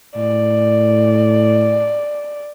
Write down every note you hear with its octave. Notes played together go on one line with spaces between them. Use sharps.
A2 D5